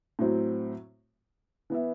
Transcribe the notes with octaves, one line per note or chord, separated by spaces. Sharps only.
A2 F#3 C4
E3 B3 E4